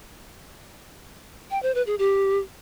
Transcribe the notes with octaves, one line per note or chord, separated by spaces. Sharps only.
G5
C5
B4
G#4
G4